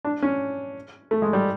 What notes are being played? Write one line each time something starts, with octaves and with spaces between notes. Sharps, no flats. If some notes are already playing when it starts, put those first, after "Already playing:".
D4
C#4
A3
G#3
G3